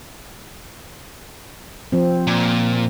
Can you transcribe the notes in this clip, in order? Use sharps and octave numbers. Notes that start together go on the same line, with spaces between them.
F3 C4
A#2